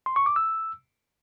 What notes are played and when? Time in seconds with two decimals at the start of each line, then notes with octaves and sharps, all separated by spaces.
0.06 C6
0.16 C#6
0.26 D6
0.36 E6